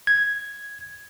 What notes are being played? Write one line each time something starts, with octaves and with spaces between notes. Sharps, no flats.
G#6